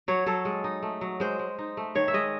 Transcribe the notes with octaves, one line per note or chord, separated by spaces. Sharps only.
F#3 C#5
F#3 A4
G#3
D#4
A3
F#3
G#3 C5
G#3
D#4
A3
D#3 C#5
E5
G#3 D#5